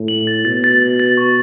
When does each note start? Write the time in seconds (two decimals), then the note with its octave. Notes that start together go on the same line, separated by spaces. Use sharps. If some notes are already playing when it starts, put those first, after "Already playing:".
Already playing: A2
0.08 F#7
0.27 A6
0.45 B2 A6
0.64 A6
0.82 A6
1.00 A6
1.17 C#6